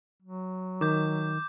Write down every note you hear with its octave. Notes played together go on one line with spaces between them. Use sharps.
F#3
D#3 D6 G6